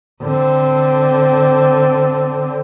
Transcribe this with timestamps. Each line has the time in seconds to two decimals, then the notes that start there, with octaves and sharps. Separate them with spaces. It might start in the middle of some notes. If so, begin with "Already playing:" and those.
0.22 D3 C4